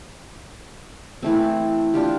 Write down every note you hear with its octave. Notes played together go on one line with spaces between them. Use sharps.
E3 A3 C4
D4 F4 G4